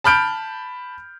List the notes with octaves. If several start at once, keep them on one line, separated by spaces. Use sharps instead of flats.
A5 B5 F6 G6 D7